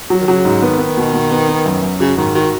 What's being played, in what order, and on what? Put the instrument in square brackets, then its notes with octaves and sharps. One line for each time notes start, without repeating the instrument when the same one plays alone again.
[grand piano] F#3
[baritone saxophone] D#3
[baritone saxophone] C#3 [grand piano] F#3
[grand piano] G#2
[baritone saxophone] D#3 [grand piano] B3
[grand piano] B3
B2
B2
B3
B3
F#2
F#2
[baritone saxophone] C#3 [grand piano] F#4
[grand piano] G#2 [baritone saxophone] D#3
[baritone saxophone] D#3 [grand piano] F#4